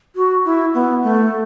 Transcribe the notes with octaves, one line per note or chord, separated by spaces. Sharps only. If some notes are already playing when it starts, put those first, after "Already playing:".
F#4
E4
B3
A3